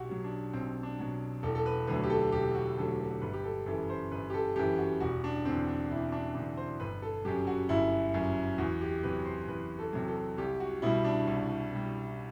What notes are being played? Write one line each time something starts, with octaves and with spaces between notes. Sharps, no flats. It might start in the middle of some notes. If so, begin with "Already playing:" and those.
Already playing: B1 F#4 G4
B2 F#3
D4
B1 C4
D4
B2 F#3
E1 A4
A4
B4
D2 D3 F#3 B4
G4
A4
E1 G4
F#4
D2 D3 F#3 A4
A4
G1 B4
G4
A4
F#2 E3 A4
C5
G1 B4
G4
A4
F#2 E3 G4
F#4
E1 F#4
D4
E2 D3 C4
D4
E1 E4
D4
E2 D3 D4
C5
G1 B4
A4
F#2 F#3 G4
F#4
G1 E4
F#2 F#3
E2 F#4
G4
C3 F#3 B4
C5
E2 B4
A4
C3 F#3
A4
C2 G4
F#4
B2 G3 E4
D4
C2
B2 G3